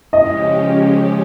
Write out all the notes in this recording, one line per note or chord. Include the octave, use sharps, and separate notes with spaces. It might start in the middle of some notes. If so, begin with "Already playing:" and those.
C#3 F3 G#3 C#4 G4 D#5